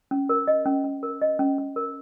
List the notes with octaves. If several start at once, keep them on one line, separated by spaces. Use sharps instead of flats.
C#4
A#4
D#5
C#4
C#4
A#4
D#5
C#4
C#4
A#4